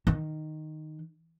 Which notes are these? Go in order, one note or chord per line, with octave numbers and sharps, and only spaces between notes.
D#3